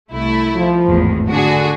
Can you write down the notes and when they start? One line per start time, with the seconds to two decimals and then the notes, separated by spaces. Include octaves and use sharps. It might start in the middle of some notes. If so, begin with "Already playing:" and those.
0.13 C2 A3 E4
0.54 F3
0.89 G#1 E2 A2
1.31 D3 D4 F#4 G#4